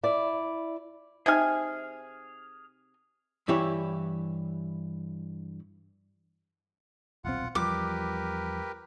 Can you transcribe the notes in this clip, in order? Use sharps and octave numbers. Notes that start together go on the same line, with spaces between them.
E4 D5
C3 D#4 G#4 G#5 F6
G2 E3 E4 G4 C#5
D#1 B1 C4 F4 F#5
E2 F3 G3 G4 A#4 B4 D6